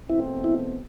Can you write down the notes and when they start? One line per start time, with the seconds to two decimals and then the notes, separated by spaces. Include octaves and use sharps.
0.09 E2 B2 A3 C4 E4
0.44 E4